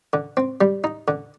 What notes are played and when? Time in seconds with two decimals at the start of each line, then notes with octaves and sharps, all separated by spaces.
0.13 D3
0.37 C4
0.61 G3
0.84 D#4
1.08 D3